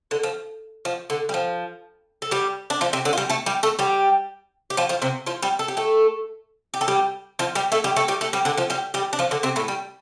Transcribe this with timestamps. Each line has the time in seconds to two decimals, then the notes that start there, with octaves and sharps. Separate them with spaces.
0.11 D3
0.23 F3
0.85 F3
1.10 D3
1.29 G3
1.34 F3
2.22 A4
2.31 G3 G4
2.70 D4
2.81 F3 F4
2.93 C3 C4
3.05 D3 D4
3.13 F4
3.17 G3 G4
3.30 A3 A4
3.46 G3 G4
3.63 A3 A4
3.79 G3 G4
4.70 G4
4.77 F3 F4
4.89 F3 F4
5.02 C3 C4
5.26 F3 F4
5.42 G3 G4
5.59 A4
5.68 G4
5.77 A3 A4
6.74 G4
6.81 A4
6.88 G3 G4
7.39 F3 F4
7.55 G3 G4
7.72 A3 A4
7.84 G3 G4
7.96 A3 A4
8.08 G3 G4
8.21 A3 A4
8.33 G3 G4
8.45 D3 D4
8.57 F3 F4
8.70 G3 G4
8.94 G3 G4
9.13 D4
9.19 F3 F4
9.31 D3 D4
9.43 C3 C4
9.56 A2 A3
9.68 G3